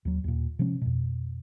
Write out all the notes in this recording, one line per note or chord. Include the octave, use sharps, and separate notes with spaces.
D#2 F#3
D#2 A#2
C3 F3 G#3 C#4
F2 B2